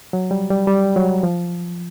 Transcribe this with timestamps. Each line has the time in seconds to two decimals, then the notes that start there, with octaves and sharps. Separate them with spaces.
0.13 F#3
0.31 G3
0.50 G3
0.67 G3
0.96 F#3
1.23 F3